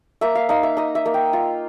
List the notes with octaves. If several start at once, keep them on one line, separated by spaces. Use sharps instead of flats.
A#3 E5
F5
D#4 F5
E5
D#4 D#5
E5
A#3
G5
F4